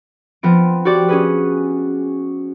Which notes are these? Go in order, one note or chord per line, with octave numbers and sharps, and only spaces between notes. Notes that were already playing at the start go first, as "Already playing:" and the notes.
F3 B3 C4 D7
F#4 G4 D5
C#4 G#4 B4